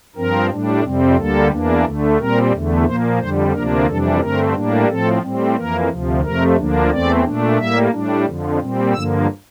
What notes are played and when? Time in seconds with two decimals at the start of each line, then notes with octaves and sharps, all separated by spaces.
0.15 G2 F3 C4 A#4
0.49 A2 G3 D4
0.83 F2 C3 G3 C4
1.16 D2 D3 G3 A#3 A4
1.51 E2 E3 A#3 D4
1.84 D2 D3 A3
2.18 A#2 G3 C4 A#4
2.52 E2 D3 A3
2.85 A#2 F3 A#3 C5
3.19 F2 D3 G3 C5
3.53 D2 C3 F3 A#3 D4 A#4
3.87 F2 C3 E3 G3 D4 A4
4.20 G2 D3 A3 C4 A#4
4.54 A2 G3 A#3 D4
4.88 A2 F3 C4 A4
5.22 A2 G3 C4
5.55 F2 E3 A#3 A#4
5.89 D2 C3 F3
6.23 F2 C3 F3 A3 A#4
6.56 D2 D3 F3 A#3 D4
6.90 E2 E3 A3 C4 D5
7.25 A#2 A3 D4
7.57 A2 G3 A#3 E5
7.92 A2 G3 D4
8.26 F2 D3 F3
8.59 A#2 G3 C4
8.93 G2 D3 F3 A#3 E6